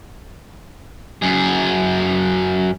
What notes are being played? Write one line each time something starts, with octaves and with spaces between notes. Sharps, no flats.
F#2 G#4